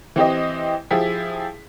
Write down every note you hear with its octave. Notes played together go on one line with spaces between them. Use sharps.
E3 C4 G4 D#5
F3 E4 G4 G#4 B6